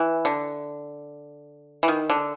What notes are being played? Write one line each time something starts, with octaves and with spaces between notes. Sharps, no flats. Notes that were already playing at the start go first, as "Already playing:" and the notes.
Already playing: E3
D3
E3
D#3
D3